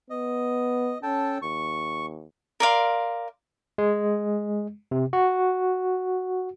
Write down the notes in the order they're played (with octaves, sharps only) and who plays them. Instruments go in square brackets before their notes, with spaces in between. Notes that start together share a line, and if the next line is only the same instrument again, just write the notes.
[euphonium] B3 [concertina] D#5
[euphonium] C#4 [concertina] A4 G5 A5
[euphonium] D#2 [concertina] C#6
[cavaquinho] A#4 D5 F5 C6
[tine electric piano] G#3
C3
F#4